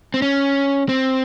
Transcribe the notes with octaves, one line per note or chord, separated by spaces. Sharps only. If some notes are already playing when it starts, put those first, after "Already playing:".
C4
C#4
C4